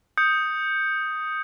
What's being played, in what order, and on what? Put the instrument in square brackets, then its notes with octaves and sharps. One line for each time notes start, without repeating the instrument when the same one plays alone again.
[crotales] D#6 G6 C#7